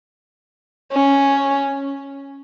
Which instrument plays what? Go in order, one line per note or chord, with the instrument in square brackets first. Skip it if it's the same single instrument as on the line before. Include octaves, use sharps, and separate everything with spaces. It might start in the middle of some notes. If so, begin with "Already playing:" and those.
[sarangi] C#4